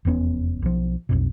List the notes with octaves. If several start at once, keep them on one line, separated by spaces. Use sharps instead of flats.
F1 E2 B3 C#4
B1 F3
B1 F2 B2